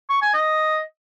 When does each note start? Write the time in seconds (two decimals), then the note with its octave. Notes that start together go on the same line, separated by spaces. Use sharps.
0.10 C#6
0.22 G#5
0.34 D#5